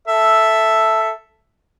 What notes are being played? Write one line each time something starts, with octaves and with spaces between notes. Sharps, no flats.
A4 E5